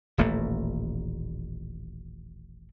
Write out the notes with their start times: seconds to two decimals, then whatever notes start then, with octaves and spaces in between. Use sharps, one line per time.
0.18 D#1 A1 A3 A#3